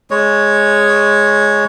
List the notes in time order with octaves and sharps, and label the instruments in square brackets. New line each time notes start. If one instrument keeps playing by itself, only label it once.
[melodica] G#3 C#5